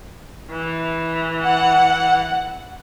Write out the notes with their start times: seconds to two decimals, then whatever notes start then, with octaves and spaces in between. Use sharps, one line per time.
0.52 E3
1.43 F#5